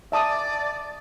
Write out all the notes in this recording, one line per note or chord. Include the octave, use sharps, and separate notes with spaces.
D5 E5 A5 D#6